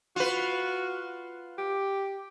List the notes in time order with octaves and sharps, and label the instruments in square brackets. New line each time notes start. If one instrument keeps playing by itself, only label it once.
[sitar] F4 B4 [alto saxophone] F#4
[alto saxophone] G4